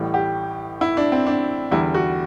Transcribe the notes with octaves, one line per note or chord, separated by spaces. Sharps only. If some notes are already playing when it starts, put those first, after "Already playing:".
Already playing: A1 A2 G3
G4
E4
D4
C4
D4
E2 D3 G3 E4
F#4